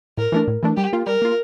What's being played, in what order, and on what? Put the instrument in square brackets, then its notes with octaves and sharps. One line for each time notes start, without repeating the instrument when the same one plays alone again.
[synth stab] A2 [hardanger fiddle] A#4
[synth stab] E3 A3 D4
A2
E3 A3 D4
[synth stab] G3 [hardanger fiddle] G4
[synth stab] A#3 F4
[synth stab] G3 [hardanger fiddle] A#4
[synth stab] A#3 F4